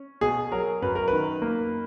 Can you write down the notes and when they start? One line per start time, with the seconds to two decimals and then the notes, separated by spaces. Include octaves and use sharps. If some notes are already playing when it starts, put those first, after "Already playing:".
Already playing: C#4
0.21 B2 G#4
0.52 F#3 A#4
0.82 F#2 B4
0.95 A#4
1.08 D#3 B4
1.42 A#3